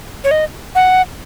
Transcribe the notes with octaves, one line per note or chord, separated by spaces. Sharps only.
C#5
D#5
F#5